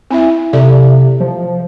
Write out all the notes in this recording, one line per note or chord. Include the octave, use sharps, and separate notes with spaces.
C4 E4 E5
C3 A4 D5 E5
F3